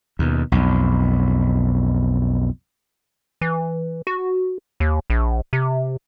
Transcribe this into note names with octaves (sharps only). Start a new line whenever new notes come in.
D#2 B2
B1 F2
E3
F#4
D#2
A#1
C3